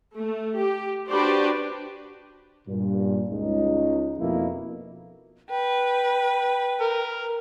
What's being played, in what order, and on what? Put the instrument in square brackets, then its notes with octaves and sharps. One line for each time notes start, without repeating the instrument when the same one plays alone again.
[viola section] A3
G4
D4 F#4 G4 B4 C5 D5
[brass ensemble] G2 A#2
C#2 D#4
F2 B2 A#3 E4
[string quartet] B4 [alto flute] G5
[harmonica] A#4